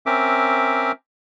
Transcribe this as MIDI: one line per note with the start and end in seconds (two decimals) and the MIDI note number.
0.06 0.92 60
0.06 0.92 61
0.06 0.92 70
0.06 0.92 76
0.06 0.92 86